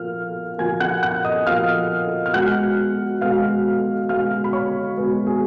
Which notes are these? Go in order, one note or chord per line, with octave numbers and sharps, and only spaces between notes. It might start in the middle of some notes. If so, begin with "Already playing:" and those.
Already playing: A#2 F3 A#3 F5 F6
A#2 F3 A#3 G#5 G#6
F#5 F#6
F#5 F#6
D#5 D#6
A#2 F3 A#3 F5 F6
F6
B2 G#3 B3 F#5 F#6
B2 G#3 B3 F5 F6
B2 G#3 B3 F5 F6
B5
C#5 C#6
B2 G#3 B3
G#4 G#5